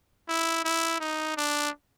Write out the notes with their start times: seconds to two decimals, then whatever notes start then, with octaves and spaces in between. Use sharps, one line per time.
0.29 E4
0.65 E4
1.01 D#4
1.37 D4